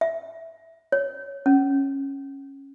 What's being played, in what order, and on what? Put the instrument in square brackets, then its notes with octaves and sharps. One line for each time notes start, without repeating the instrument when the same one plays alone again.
[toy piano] E5
C#5
C#4